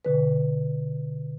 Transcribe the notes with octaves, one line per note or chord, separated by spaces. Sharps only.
B2 D3 B4